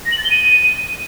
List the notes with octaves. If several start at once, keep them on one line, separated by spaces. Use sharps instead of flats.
A#6
F#7
A6
G7
D#7